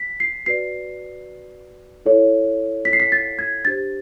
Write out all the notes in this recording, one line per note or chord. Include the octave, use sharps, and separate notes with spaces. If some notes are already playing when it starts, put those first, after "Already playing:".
Already playing: B6
C7
F#4 B4 D5 C7
E4 A4 C#5
B6
C7
B6
A6
G#6
D4 G4 C5 A6